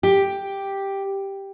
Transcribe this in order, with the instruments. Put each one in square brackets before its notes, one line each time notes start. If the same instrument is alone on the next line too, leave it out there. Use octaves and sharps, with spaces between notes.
[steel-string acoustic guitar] G4